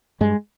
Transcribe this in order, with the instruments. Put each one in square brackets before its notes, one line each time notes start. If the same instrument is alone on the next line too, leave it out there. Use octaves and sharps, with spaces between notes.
[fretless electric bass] G2 G#3